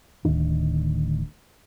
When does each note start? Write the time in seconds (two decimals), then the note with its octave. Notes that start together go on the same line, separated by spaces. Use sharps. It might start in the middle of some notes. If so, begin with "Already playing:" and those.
0.25 D1 D2 D#3 D4